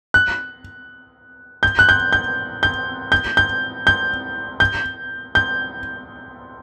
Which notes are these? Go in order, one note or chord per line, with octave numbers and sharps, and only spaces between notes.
F#6
G6
F#6
G6
G6
G6
G6
G6
G6
G6
G6